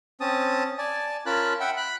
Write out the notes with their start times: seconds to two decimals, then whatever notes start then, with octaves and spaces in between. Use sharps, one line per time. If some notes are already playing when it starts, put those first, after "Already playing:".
0.21 C4 C#4 A5 D#6
0.78 D5 G#5 A5
1.26 C#4 F4 A#4 A5 B5 F#6
1.60 E5 F#5 G5 B5
1.77 B5 F#6